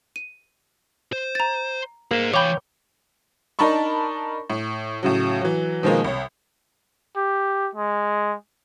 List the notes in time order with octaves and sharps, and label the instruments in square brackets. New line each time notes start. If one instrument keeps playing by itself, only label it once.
[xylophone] D#7
[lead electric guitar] C5
[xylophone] A#5 A6
[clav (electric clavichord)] A#3 [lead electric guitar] G#4 C5
[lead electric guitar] E3 F5 [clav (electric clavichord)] C#5 G5 [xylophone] B5 D6
[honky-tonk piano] D4 D#4 A#4 A5 B5 C#6
A2
A2 C#3 F#3
E3 F#3
B2 D#3 F3 G#3 A#3
C2 C#5
[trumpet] G4
G#3